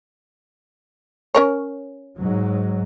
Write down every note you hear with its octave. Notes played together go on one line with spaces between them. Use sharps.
C#4 A#4 C#5
G#2 F#3